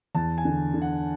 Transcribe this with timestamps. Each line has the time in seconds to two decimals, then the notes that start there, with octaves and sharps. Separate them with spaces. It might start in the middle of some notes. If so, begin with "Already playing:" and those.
0.15 E2 A5
0.38 G#5
0.45 D3
0.74 D3
0.82 F#5